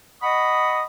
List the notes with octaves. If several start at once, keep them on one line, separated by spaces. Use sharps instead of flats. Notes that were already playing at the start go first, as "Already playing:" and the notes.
D#5 F#5 B5 C#6 D#6